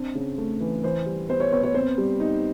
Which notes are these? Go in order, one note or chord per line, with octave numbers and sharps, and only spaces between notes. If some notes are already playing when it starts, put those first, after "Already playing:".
Already playing: C4 D4
C#3
A3
E3
E3 C5
G3
B3 C5
C#5
B3 C#5
C#5
C4 C5
G3
D#4